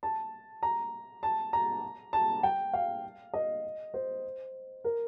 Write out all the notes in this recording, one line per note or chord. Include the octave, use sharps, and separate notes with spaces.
A5
A#5
A5
A#5
A5
G5
F5
D#5
C5
A#4